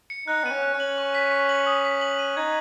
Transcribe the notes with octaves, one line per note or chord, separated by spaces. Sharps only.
C#7
D#4 F#6
B3 D#7
C#4
F#6
C#4
F#7
C#6
B6
C#6
F#7
D#6
B6
F#7
D#7
D#4 G#6